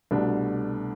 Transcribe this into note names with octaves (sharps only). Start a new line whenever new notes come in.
C2 B2 A3 D4